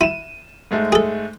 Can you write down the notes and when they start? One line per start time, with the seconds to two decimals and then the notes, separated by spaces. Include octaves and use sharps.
0.01 E4 D#7 E7
0.71 G#2 G#3 A3
0.92 G#4 A4